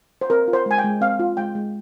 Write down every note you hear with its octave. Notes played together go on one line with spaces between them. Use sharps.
C5
C4 A#4
F4
C5
G#3 G#5
G5
G#3
C4 F5
F4
G#3 G5
G#3